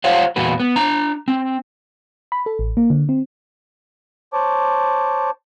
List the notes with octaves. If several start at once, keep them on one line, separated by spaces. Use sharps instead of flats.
F4 C5 C#5 F5 F#5
E2 A#2 F#4 B4
B3
D4 A#5
C4
B5
A4
A1
A#3
D3
C4
C5 C#5 A5 D6